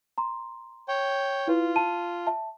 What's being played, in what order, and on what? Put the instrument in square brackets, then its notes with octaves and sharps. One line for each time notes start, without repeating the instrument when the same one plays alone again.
[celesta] A#5 C6
[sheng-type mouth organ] C#5 G5
[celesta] E4 B4 [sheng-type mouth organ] F4
[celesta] A5 D#7
E5 A5